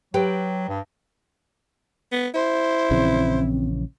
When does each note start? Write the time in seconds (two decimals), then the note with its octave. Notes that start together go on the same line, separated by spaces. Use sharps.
0.14 F#3 G4 B4 G5
0.69 G2
2.12 B3
2.35 E4 C5
2.91 A#1 C#3 E3 C4